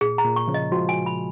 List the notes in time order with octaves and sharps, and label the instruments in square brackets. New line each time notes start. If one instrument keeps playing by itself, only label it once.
[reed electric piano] A#2 [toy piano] G#4
[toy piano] A#5
[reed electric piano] A#2
[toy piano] C#6
[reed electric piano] C#3 F3
[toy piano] D#5
[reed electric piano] F3 G#3 [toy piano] F#4
[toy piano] G#5
B5